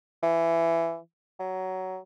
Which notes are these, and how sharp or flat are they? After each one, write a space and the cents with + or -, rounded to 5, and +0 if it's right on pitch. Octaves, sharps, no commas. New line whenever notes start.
E3 +15
F#3 +15